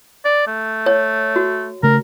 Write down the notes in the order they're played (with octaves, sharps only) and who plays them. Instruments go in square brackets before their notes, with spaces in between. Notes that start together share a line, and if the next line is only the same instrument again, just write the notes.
[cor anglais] D5
A3
[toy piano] C#5
F#4
[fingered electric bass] C#3 A3 [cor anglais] A#4